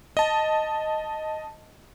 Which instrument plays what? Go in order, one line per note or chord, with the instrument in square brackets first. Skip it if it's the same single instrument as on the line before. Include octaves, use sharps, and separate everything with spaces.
[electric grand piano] D#5 A5